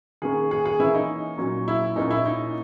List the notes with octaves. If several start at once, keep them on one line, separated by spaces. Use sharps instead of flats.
D#3 A#3 C#4 G#4
G#4
G#4
E3 A#3 C#4 E4
D#4
A#2 F#3 C#4
E4
A#2 A#3 C#4 D#4
E4
D#4